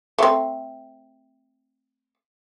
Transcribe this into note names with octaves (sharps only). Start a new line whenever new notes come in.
A3 C4